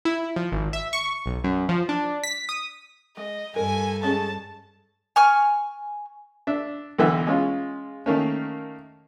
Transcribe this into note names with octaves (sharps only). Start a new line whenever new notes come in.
E4
F3
G#1
E5
C#6
B1
F#2
F3
D4
B6
D#6
G#3 D#5
G2 A4 A#4 G#5
G#3 C#4 G#4 A5
G#5 C#6 F6
D4 E5
B1 D3 E3 E5 F#5
G#3 C#4 F4
D#3 A3 A#3 C#4